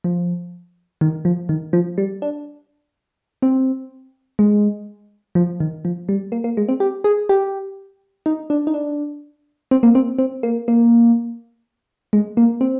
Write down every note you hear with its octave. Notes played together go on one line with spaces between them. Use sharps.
F3
D#3
F3
D#3
F3
G3
D4
C4
G#3
F3
D#3
F3
G3
A#3
A#3
G#3
C4
G4
G#4
G4
D#4
D4
D#4
D4
C4
A#3
C4
C4
A#3
A#3
G#3
A#3
C4